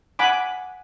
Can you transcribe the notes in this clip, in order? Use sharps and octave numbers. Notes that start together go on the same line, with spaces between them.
F#5 G#5 B5 D6